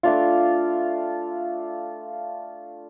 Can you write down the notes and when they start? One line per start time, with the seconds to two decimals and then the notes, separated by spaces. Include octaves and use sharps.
0.03 A3 D4 F4